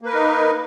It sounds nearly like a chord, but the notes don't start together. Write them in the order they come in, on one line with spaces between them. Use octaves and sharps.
A#3 B4 A#4 D#4